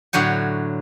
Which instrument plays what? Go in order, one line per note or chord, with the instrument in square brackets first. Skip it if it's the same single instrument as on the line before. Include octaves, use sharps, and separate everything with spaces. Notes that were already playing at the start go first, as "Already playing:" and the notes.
[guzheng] A2 D3 F#3 C#5 G5